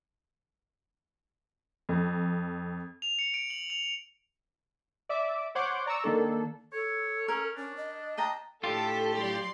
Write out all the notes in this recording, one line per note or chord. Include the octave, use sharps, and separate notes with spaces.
F2
F7
C#7
D7
F#7
F7
F7
D5 E5 D6
C5 C#5 F#5 C6 D6 G6
D5 A#5 C#6 E6
D#3 A#3 D4 A4
A4 C#5
C#4 A#4
C#4 D4
D#5
D#5 G5 A5 A#5
A2 D4 F4 G4 A4
F#3 D5 C6